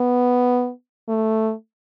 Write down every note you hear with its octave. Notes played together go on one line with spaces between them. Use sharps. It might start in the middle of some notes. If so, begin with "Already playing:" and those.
Already playing: B3
A3